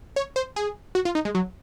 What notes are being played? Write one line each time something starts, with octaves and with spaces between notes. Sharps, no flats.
C#5
C5
G#4
F#4
F4
D#4
G#3
F#3